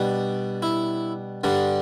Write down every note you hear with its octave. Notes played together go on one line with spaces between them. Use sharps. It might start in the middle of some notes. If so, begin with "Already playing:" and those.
Already playing: B2 G3 D4
E4
G2 D3 G3 D4